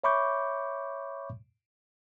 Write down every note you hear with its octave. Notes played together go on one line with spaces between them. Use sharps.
C#5 E5 B5 C#6 D6 G6